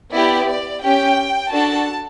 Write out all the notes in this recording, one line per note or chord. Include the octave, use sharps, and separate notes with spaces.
B3 E4 G4 D5
D5
C#4 G4 G5
D4 F#4 A4 A5